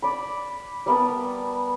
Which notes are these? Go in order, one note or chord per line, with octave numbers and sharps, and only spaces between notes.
D5 B5
G3 B3 A#4 A5